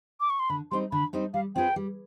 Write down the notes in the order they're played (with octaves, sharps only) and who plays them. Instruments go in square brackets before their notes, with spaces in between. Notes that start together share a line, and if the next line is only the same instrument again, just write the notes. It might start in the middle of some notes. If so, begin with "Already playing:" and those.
[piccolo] D6
C#6
C6
[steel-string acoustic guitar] D3 [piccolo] B5
[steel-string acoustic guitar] G3 C4 D#4 [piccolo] C6
[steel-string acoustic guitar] D3 [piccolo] B5
[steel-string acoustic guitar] G3 C4 D#4
[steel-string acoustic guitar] G3 [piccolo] F5
[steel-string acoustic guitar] C4 F4 G#4 B4 [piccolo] G5
[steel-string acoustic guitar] G3